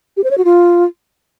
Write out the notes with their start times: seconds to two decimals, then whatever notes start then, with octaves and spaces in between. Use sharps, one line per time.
0.17 G4
0.24 C5
0.31 C#5
0.38 F#4
0.45 F4